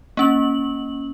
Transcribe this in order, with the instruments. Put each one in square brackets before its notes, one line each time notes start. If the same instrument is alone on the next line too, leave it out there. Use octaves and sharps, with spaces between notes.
[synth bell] A#3 C#4 F#7